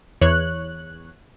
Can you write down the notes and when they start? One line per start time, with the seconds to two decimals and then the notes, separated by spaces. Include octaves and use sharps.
0.21 E2 C#5 F#6